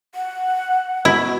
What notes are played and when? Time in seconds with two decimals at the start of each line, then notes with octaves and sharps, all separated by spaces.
0.15 F#5
1.05 B2 E4